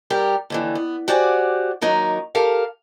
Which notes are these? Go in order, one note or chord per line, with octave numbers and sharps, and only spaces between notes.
G3 G4 A#4
D#2 D3 E3
B3
F#4 G4 C5 D5 F#5 G#5
D#2 F#3 D#4 A#4 A#5
G4 A4 A#4 F5